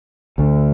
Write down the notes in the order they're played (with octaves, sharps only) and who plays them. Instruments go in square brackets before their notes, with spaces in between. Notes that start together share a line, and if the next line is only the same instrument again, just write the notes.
[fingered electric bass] D2 D3